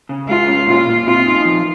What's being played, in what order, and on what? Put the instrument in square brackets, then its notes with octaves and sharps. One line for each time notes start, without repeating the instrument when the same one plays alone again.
[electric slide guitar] C#3
[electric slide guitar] G#3 [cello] F4
[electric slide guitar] C#4
[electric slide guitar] A#2 [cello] F4
[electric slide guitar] A#2
[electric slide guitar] C4 [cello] F4
[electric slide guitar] D#4
F3